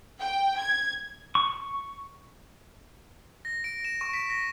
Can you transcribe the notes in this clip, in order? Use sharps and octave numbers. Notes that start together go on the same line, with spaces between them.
G5
G#6
C#6
A#6
D7
E7
C#6
B6
A#6